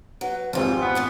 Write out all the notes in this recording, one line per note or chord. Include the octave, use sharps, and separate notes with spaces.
F#3 B4
G#1 F2 G3 F4 C5
B3
A2 E3 F3